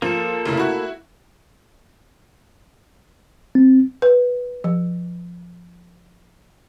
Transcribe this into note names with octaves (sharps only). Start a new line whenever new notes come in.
F3 A#3 A4
F1 C#3 E4
E4 F#4
C4
B4
F3